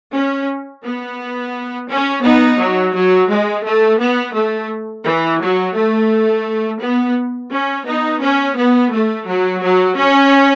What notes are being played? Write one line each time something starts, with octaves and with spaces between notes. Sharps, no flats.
C#4
B3
C#4
B3 D#4
F#3
F#3
G#3
A3
B3
A3
E3
F#3
A3
B3
C#4
B3 D#4
C#4
B3
A3
F#3
F#3
C#4